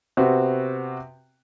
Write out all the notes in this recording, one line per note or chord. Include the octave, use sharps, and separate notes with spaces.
C3 B3 C4 F#4